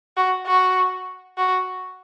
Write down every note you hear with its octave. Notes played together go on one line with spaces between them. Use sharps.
F#4
F#4
F#4